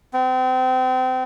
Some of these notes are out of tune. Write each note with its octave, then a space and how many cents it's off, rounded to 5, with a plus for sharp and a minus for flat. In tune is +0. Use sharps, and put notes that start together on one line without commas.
C4 -35